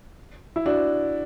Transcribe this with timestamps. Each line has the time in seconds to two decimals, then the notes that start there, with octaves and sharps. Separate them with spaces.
0.56 E4
0.66 D4 F#4